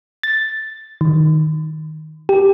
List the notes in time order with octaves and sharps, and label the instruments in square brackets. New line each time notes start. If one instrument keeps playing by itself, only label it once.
[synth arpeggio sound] A6
D#3
G4